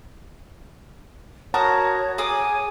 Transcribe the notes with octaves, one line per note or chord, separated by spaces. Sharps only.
F#4 A#4 C#5 F#5 A5 A#5 D#6
G#4 G#5 D6 D#6